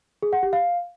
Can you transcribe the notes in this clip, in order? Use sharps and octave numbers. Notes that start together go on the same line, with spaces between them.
G#4
F#5
G4
F5